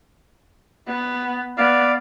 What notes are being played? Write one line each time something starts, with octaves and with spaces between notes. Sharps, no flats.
B3
B3 D5 F5